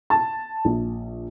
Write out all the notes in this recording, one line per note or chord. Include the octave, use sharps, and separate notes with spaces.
A5
A#1